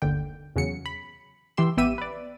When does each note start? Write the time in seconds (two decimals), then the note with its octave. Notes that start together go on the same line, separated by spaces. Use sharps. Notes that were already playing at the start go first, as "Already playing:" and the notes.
0.02 G1 D#2 D3 G5
0.56 E2 C#3 F#3 C#7
0.86 B5
1.57 E3 G4 C6 E6
1.77 A1 B3 G4 E5 E6 D#7
1.98 B4 D5